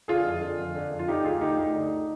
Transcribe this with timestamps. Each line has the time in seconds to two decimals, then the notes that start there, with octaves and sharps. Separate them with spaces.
0.08 D3 F4 G#4
0.25 F2
0.41 D3
0.59 F2
0.75 D3
0.91 F2
0.99 F4
1.08 D3 D#4 G4
1.24 D2 F4 G#4
1.41 D3 D#4 G4
1.58 D2 D#4
1.74 D3